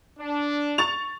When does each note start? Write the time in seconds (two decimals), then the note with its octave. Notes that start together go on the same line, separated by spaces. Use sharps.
0.19 D4
0.78 C#6 A6 F7